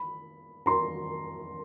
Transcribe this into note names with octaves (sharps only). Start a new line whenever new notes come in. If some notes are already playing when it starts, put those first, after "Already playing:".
Already playing: B5
A#5 C6